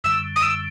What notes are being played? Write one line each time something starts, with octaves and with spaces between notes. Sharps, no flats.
F#2 D3 G3 E6
D#6
E6